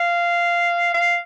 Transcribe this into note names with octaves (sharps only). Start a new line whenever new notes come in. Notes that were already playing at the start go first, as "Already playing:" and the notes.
Already playing: F5
F5